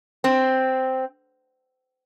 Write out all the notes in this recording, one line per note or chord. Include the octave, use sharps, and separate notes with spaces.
C4